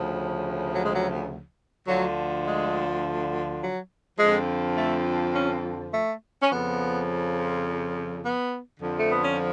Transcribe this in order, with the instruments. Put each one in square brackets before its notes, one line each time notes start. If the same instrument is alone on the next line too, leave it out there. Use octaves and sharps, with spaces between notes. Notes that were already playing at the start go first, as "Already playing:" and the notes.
Already playing: [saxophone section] D2 C#3 F3
F#3
G#3
F#3
D2 D3 F3 F#3
G#3
F#3
F2 D3 F3 G#3
A3
C#4
A3
C#4
F2 C#3 F3 B3
B3
F2 D3 F3
A3
B3
C#4